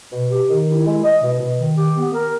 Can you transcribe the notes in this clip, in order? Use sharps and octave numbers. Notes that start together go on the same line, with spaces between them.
B2
G4
D#3
E4
G#3
D#5
B2
B2
D#3
G4
B3
A#4